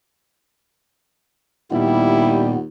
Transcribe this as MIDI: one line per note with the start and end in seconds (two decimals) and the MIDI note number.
1.71 2.67 39
1.71 2.56 46
1.71 2.54 55
1.71 2.56 59
1.71 2.48 64